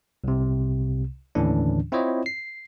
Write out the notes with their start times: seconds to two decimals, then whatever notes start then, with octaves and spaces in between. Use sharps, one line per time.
0.24 C2 C3
1.35 D#2 A2 D3 E3 C#4 D4
1.92 C4 E4 F4 C5 C#5 D#5
2.26 C7